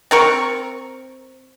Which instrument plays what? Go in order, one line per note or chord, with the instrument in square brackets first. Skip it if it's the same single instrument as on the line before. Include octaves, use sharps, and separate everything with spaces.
[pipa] C4 A#4 C#6